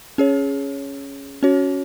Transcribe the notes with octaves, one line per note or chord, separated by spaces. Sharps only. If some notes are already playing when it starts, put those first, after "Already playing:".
C#4 G#4 C#5
C#4 F#4 C#5